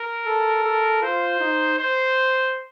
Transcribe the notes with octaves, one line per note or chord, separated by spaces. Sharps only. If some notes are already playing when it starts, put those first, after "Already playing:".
Already playing: A#4
A4
A4
F4 C5
D#4
C5